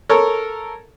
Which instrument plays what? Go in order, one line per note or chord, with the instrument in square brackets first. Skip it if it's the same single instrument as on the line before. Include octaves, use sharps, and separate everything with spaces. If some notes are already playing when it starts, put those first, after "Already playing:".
[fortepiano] A4 A#4 C#5